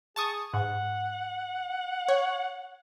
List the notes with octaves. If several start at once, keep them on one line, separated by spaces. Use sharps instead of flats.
G#4 A5 C#6 D#6
G#2 F#5
C#5